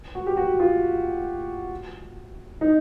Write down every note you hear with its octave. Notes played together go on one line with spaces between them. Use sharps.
F#4
G4
F#4
F4
D#4